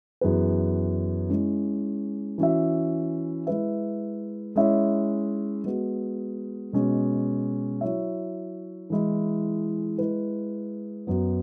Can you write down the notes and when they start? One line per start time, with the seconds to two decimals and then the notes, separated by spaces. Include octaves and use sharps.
0.21 F#2 E3 B3 G#4 B4
1.29 G#3 C#4 E4
2.38 E3 C#4 F#4 E5
3.47 G#3 E4 B4 E5
4.56 G#3 C#4 E4 C#5 E5
5.64 G#3 B3 F#4
6.73 B2 G#3 C#4
7.81 F#3 E4 C#5 E5
8.90 E3 G#3 E4
9.98 G#3 E4 B4
11.07 F#2 F#3 B3